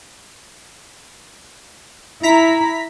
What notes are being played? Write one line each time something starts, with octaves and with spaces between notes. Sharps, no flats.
E4 A#5 B6